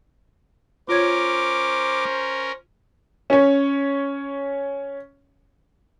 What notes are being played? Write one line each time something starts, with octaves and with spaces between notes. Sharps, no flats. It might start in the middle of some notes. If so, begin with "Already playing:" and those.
C#4 F4 A#4 C5 C#5 D6 G#6
C#4 C#5